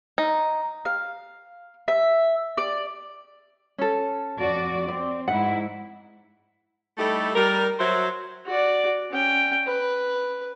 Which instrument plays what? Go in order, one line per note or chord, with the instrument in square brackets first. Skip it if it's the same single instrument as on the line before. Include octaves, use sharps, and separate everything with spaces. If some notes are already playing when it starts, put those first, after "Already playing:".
[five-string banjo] D#4
[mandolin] F5
E5
D5
[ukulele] C#4 A4
[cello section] F2 F#4 D5
[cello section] C4 [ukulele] D5
[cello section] G#2 E4 [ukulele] F#5
[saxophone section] G3 A3 D#4 E4 G4 A4
G3 A#4
F#3 C5 E5
[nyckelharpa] F#4 D5
C#4 G5
B4